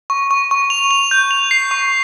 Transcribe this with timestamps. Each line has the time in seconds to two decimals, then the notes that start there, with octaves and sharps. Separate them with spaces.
0.10 C#6
0.31 C#6
0.51 C#6
0.70 F7
0.91 F7
1.11 G6
1.31 F7
1.51 C7
1.71 C#6